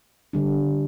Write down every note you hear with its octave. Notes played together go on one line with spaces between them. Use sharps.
D3 G3 D4